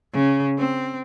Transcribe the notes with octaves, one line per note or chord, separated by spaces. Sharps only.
C#3
C4